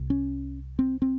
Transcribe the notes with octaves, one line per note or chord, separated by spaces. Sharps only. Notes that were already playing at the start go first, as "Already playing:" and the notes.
Already playing: C2 C3
C#4
C4
C4